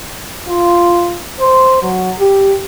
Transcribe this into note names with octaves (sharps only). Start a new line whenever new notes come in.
F4
C5
F#3
G4